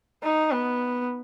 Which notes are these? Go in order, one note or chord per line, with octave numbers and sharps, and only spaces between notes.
D#4
B3